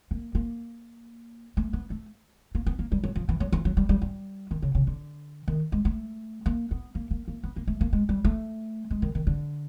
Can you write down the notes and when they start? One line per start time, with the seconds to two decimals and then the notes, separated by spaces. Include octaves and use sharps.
0.11 A#3
0.35 A#3
1.57 A3
1.73 B3
1.90 A3
2.55 A#3
2.66 B3
2.79 A#3
2.92 G3
3.04 F#3
3.16 F3
3.29 E3
3.40 F#3
3.52 F3
3.65 F#3
3.77 G3
3.89 G3
4.02 G3
4.51 D#3
4.62 C#3
4.75 C#3
4.87 D3
5.48 D#3
5.72 G#3
5.85 A3
6.46 A#3
6.71 B3
6.95 A#3
7.11 A#3
7.28 A#3
7.43 B3
7.56 A#3
7.68 A3
7.81 A#3
7.93 G#3
8.09 G3
8.25 A3
8.91 G#3
9.02 D#3
9.15 D#3
9.27 D3